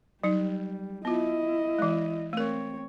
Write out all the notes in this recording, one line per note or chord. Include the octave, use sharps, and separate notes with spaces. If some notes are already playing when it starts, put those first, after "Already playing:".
F#3 G3 D#4
B3 E4 F4 D#5
E3 G#3
A3 C4 A#4 C#5